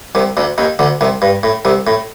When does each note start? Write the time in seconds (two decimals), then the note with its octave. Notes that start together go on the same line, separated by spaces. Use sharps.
0.15 C2 C3
0.37 D2 D3
0.58 D#2 D#3
0.79 D2 D3
1.01 C2 C3
1.22 G2
1.43 A2
1.65 C2 C3
1.87 A2